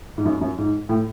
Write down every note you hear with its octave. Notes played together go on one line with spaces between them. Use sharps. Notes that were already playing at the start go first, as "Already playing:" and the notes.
G#2
F#2
F#2
G#2
A2